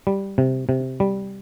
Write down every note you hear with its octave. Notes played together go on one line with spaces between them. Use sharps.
G3
C3
C3
G3